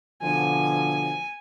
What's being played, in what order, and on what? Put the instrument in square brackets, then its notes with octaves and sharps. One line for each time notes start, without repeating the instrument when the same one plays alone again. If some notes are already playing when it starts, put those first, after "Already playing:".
[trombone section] B2 D3 F3 [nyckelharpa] G#5